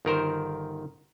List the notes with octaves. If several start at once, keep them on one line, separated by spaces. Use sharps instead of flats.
G1 D#3 A#4 C5